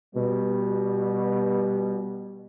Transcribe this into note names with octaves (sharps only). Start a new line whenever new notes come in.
B2 G3